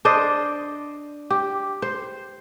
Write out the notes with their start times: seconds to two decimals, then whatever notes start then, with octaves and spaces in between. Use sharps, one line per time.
0.05 D4 C5 D5 D#5
1.30 G4
1.82 C5